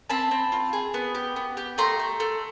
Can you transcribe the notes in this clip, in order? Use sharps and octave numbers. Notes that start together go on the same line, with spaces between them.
C4 A5 B5
C4
F4
G#4
B3
G4
B3
G4
A3 A#5 C6
A3
A3